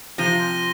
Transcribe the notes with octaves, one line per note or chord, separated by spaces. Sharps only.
C3 F3 A#6 D#7 G7